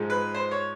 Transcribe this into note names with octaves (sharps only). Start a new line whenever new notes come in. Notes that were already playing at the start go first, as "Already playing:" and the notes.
Already playing: G#2 F3 G#3
B4
C5
C#5